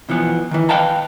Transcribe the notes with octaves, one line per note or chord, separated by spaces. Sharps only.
B2 E3 F3 B3
D#3 E3
B4 D#5 F5 G5 A5 A#5